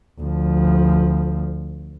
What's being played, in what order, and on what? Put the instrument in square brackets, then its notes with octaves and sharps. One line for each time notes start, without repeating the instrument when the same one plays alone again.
[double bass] D2 F3